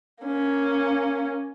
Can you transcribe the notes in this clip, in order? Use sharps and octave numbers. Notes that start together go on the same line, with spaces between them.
A#3 C#4